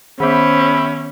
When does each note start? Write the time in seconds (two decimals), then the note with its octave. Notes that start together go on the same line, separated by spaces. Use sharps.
0.20 D#3 B3 C#4 C5 E5 G5 B5